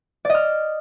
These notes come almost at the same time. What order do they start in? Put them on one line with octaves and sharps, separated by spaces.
D5 D#5 F6